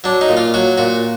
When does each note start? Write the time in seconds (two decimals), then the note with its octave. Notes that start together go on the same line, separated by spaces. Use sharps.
0.04 F#3 D4
0.21 D#4
0.29 A#2
0.37 F4
0.54 F#3 F#4
0.78 A#2 F#4